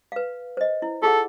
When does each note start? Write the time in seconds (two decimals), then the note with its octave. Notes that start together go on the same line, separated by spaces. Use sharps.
0.12 B4 F5
0.57 C5 D#5
0.82 E4
1.02 F4 G#4 A4 F#5